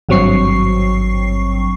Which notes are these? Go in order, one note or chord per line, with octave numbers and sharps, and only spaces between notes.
G#1 G2 F#3 C4 C#6 C7